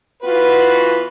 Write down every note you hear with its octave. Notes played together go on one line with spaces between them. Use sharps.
E3 B3 F4 F#4 B4